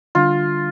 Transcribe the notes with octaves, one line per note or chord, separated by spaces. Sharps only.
D3 G3 D4 F4